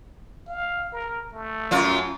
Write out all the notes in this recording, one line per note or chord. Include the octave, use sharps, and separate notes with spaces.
F5
A#4
A3
F#2 F4